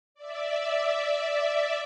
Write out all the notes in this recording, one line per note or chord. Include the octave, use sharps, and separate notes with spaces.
D5 E5